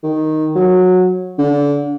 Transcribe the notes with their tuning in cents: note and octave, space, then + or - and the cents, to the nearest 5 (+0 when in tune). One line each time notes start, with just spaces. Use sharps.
D#3 +0
F#3 -15
D3 -30